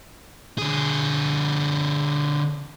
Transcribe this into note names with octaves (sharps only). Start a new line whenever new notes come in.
D3 G#4